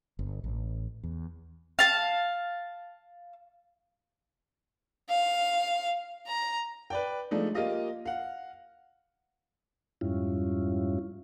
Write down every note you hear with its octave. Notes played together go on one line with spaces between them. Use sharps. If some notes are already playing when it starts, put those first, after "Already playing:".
G1
A1
E2
F5 A5
F5
A#5
B4 D5 G5
F3 G#3 A3 D4 D#4
A#3 F4 G4 D#5 F5
F5 F#5
F2 G#2 G3 C#4 E4 F4